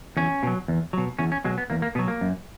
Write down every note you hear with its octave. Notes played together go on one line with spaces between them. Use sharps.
E2 C#4
B2 F#3
E2
B2 F#3
E2 C#4
C#4
B2 F#3 G#3
B3
E2 A#3
A#3
B2 F#3 B3
A#3
F#2